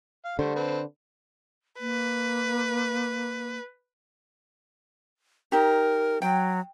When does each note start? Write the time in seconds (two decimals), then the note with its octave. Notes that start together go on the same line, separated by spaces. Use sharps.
0.25 F5
0.39 D3 G3 A3 C5
0.56 C4 A4 B4
1.80 A#3 B4
5.52 D#4 G4 A#4
6.22 F#3 G5